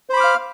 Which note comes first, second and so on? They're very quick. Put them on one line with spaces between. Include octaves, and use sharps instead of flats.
C5 B5 D6 F6 F5